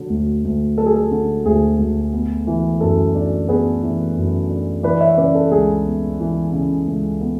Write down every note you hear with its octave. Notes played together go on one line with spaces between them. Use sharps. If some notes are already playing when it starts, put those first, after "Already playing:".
Already playing: D3 F#3
D2
D2
F#3 A4
G#4
A4
D3
D2 G#4
D2
B3
E3
F#2 A4
D4
B3 G#4 B4
E3
F#2
D4
E3 B4 D5
C#5 E5
C#3 B4 D5
A4
C#2 G#4
B3
E3
C#3
C#2
B3